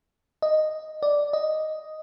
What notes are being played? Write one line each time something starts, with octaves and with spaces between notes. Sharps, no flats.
D#5
D5
D#5